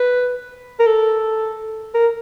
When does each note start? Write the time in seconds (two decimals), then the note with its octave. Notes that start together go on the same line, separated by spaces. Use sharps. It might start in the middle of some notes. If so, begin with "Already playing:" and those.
Already playing: B4
0.80 A#4
0.86 A4
1.94 A#4